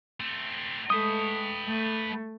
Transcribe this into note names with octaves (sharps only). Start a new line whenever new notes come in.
A3 C4
G#3 A3 B4 G5 D#6
A3